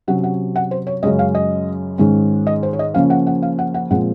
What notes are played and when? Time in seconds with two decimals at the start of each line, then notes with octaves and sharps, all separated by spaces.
0.07 C3 F#3 C#4 F#5
0.24 F#5
0.56 F#5
0.71 C5
0.87 C#5
1.02 F#2 C#3 G#3 C#4 D#5
1.19 F5
1.35 D#5
1.98 G#2 D#3 G#3 C#4
2.47 D#5
2.63 C5
2.73 C#5
2.79 D#5
2.94 C#3 F3 A#3 C#4 F5
3.10 F#5
3.27 F#5
3.42 F5
3.59 F#5
3.74 F#5
3.91 A#2 F3 G#3 C4 F#5